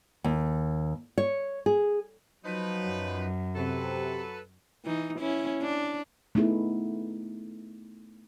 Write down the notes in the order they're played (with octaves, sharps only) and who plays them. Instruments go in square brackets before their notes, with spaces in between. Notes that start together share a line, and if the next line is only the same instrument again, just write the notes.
[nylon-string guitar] D#2
C#5
G#4
[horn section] F3 D#4 B4 [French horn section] F#3
[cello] F#2
[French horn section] C3 [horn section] F#3 A4 B4
[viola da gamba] E3 D#4
C#4 E4
D4
[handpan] A3 B3 D#4 E4 G#4